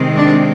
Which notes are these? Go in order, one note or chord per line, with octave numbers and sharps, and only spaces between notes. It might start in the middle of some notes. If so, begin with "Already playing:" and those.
Already playing: C3 D#3 G#3 C4
D4